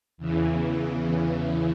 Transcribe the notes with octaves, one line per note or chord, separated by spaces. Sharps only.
E2 C#3 E3